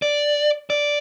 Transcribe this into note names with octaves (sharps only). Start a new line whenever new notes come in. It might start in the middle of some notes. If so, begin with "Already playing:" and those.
D5
D5